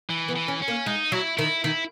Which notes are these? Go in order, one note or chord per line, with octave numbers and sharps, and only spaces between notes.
E3
B3
E3
C#4
C#4
A#3
G#3 D#4
F#3 E4
D#3 E4
D#3 E4